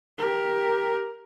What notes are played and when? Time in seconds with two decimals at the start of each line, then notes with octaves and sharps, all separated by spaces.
0.18 G4 A#4